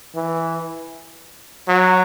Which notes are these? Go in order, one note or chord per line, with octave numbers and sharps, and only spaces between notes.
E3
F#3